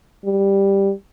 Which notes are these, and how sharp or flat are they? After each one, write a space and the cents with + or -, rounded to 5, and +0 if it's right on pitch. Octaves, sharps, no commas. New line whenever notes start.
G3 +5